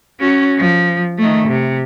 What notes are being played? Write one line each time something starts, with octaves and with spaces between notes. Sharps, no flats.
C#4 F#4
F3
D#3 A3
C3